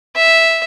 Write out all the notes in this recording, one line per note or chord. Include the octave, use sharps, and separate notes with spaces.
E5